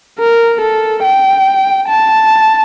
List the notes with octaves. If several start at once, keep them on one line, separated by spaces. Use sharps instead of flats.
A#4
A4
G5
A5